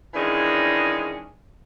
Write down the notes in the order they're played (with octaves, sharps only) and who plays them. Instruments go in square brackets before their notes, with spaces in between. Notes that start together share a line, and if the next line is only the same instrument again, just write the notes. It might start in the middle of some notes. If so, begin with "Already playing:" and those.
[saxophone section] D#3 E3 G#3 C#4 D4 G#4